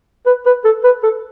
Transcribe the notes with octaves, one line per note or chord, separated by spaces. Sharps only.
B4
B4
A4
B4
A4